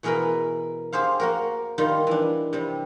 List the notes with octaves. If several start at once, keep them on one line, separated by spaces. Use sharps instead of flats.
B2 E3 G#4 A#4 B4 B5
G4 G#4 C5 F5
A#3 F#4 A#4
D#3 G3 F4
E3 D4
C3 G3